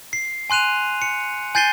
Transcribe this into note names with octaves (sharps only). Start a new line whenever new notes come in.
C7
G#5 C6 F#6 D#7 F7
C#7
G#5 G6 A6 C7 D#7 G7